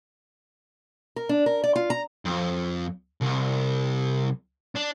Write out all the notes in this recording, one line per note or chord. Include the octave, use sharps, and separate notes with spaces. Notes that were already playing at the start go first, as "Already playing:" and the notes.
A#4
D4
A#4
D5
F4
A#5
F2
C2
D4